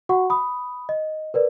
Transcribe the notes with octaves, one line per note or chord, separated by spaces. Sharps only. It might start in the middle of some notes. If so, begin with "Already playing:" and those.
F#4 F#5 C#6
B5 D#6
D#5
A#4 B4 D5